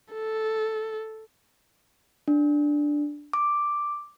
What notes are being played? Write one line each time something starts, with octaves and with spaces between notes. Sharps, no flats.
A4
D4
D6